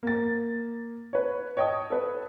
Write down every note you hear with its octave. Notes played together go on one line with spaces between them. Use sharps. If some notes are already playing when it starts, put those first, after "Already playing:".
A#3 A6
B4 C#5
C#5 D#5 G5 A5 D#6
A4 B4